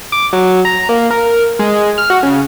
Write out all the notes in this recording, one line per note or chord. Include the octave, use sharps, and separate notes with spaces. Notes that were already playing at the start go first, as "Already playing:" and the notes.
D6
F#3
A#5
A#3
A#4
G#3
F6
F#4
C#3